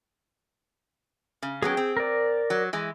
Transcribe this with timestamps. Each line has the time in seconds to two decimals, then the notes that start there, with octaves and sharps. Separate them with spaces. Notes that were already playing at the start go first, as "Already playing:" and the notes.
1.42 C#3
1.62 F#3 B3 C#4 G#4 G5
1.77 C4
1.97 A#4 D5
2.50 F#3
2.73 E3 G#3